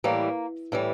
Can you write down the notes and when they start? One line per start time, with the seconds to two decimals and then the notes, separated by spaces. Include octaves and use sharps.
0.04 A2 E3 G3 A#3
0.72 A2 E3 G3